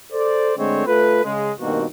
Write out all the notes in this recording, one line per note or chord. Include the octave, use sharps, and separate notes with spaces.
A4 C5 D5
D3 G#3 A3 C4 C5 C#5
A3 F4 A4 B4
C#3 G#3
G2 B2 D#3 A#3 C4 F#4